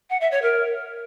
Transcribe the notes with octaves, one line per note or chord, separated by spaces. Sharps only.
F#5
E5
C#5
A#4